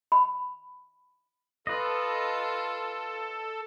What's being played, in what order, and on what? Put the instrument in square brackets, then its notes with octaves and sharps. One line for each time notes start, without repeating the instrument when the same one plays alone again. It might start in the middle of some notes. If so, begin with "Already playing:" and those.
[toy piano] B5
[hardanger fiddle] F4 [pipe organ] A4 [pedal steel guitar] B4 D#5